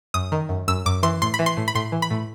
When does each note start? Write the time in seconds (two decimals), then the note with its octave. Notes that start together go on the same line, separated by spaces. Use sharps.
0.14 F#2 D#6
0.32 D#3
0.49 F#2
0.68 F#2 E6
0.86 F#2 D6
1.03 E3 C6
1.22 A2 C6
1.34 B5
1.39 E3
1.46 C6
1.57 A2
1.68 B5
1.75 A2 C6
1.92 E3
2.02 B5
2.11 A2